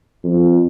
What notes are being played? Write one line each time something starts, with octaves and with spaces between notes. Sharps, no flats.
F2